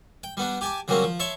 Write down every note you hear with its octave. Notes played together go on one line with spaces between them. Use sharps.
G5
G3 B3 D4
G4 G#5 A5 D6
C#3 F#3 G3 A#3 C4 C#4
F3
C#5 E5 A5 C6